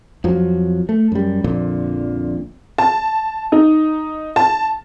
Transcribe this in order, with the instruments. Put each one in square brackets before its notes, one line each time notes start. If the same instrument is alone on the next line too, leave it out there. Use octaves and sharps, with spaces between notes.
[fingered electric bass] F2 F3 F#3
A3
F#2 G3
A#1 F2 A#2 D3
[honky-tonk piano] A5
D#4
A5